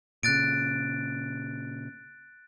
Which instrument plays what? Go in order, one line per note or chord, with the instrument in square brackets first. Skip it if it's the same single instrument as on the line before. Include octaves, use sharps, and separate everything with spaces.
[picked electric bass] A#2 C#3 [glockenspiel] F#6 A6 D7